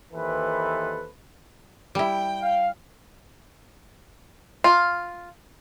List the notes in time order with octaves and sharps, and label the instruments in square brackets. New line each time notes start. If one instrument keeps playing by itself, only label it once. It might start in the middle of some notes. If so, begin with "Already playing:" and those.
[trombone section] D#2 E3 A4 B4 C5
[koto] G3 E4 [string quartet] G5
[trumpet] F5
[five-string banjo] F4